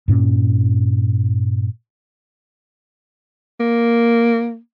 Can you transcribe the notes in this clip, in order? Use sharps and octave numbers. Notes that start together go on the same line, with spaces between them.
G2 A#2 C#4
A#3